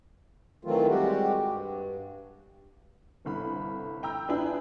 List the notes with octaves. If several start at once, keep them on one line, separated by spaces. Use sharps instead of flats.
D#3 E3 F#3 A3 C4 F4
G3 G#3 C4 F#4 G4
G2
G1 C2 D3 B5
G5 A#5 E6 G6
D4 E4 F4 G#4 B4